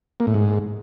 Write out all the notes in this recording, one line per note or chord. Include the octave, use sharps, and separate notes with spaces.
A#3
A2
G#2